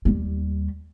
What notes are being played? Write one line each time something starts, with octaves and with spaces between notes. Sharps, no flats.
D#2 G3